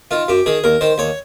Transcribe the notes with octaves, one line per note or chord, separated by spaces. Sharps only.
D#3 F4
F#2 G4
D#3 G#4
D#2 A#4
D#3 C5
D#2 C#5